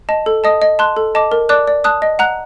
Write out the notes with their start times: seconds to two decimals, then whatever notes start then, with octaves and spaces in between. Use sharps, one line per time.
0.09 D#5 A5
0.26 A4
0.44 D#5 A5 D#6
0.62 D#5
0.79 A5 C6 F#6
0.97 A4
1.15 D#5 A5 D6
1.32 A#4
1.49 D5 A5 D6 F#6
1.67 D5
1.84 A5 D#6 F#6
2.02 D#5
2.19 F#5 A#5 F#6